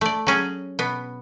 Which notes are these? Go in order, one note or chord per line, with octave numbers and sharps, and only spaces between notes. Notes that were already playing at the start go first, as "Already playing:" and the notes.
A3 D5
F#3 C#4 G#4
B2 B3